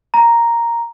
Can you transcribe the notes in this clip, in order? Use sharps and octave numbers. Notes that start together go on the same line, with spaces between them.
A#5